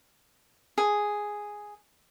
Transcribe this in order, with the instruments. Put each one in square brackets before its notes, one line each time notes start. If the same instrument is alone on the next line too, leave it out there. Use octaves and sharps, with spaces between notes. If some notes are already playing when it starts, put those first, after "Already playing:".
[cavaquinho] G#4